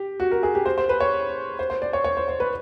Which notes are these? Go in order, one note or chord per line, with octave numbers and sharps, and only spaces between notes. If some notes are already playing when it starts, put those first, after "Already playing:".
Already playing: G4
F#4
A#4
G#4
G4
C5
C5
B4
C#5
C5
C5
D5
C#5
C#5
C5
C5
B4